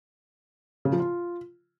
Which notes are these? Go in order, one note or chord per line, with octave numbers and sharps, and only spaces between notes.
C#3
F3
F4